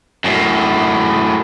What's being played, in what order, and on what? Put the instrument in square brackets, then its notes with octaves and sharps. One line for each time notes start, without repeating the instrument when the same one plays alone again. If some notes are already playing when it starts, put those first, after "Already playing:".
[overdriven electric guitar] F#2 A2